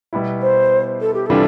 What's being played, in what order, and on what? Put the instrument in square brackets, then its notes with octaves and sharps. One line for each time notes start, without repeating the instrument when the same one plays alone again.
[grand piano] B2 G3 B3 E4
[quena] C5
A4
G4
[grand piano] C3 E3 G3 D4 F4 [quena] A4